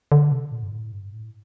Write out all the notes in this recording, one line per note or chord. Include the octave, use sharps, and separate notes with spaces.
D3
C3
A#2
G2
A2
G2
A2